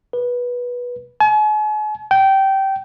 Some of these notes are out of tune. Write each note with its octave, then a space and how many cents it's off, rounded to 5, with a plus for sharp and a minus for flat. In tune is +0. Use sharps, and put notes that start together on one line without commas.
B4 -15
G#5 +45
G5 -20